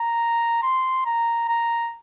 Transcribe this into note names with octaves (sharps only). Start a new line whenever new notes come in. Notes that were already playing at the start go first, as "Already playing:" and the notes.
Already playing: A#5
C6
A#5
A#5